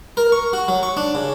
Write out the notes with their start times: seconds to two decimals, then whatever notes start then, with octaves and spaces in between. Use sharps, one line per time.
0.17 A#4
0.32 C#6
0.53 F#4
0.68 F#3
0.83 C#6
0.97 D4
1.15 C#3